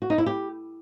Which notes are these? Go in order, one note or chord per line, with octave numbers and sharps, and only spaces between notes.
F#4
D#4
E4
G4